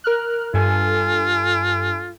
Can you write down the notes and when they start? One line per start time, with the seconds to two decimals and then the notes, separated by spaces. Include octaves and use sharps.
0.04 A#4 F6 F#6
0.54 G2 F4 A4 G#5